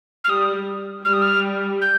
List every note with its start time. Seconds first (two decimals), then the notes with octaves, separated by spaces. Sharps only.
0.24 F6
0.29 G3 D#6
1.05 G3 F6
1.13 D#6
1.22 F6
1.81 G6